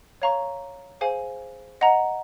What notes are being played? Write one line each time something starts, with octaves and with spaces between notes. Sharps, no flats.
C#5 F5 A#5 C#6
G#4 C5 F5 G#5
D#5 F#5 A#5